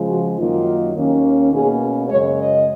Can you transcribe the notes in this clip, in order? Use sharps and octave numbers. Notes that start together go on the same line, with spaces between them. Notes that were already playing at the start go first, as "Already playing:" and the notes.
Already playing: C#3 F3 G#3
F#4
F#2 D#3 F#3 A#3 D#4 F4
D#2 D#3 A#3 C#4
B2 A#3 C#4 G#4
F#2 C#3 G#3 C#5
D#5